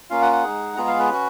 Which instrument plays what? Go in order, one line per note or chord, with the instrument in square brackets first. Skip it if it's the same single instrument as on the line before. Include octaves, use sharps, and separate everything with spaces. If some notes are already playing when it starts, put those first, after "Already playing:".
[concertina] A#3 C#4 F4 F5
F#5
F#5
G#3 D#4 G#4
G#3 B3 F4 G#4 A#5
F5
B4
C#4 F#4